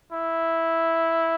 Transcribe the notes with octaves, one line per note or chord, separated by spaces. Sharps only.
E4